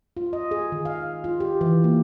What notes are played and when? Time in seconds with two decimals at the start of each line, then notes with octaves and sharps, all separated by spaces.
0.17 F4
0.33 D#5
0.51 G#4
0.72 D#3
0.85 F5
1.24 F4
1.40 G4
1.61 E3
1.84 A#3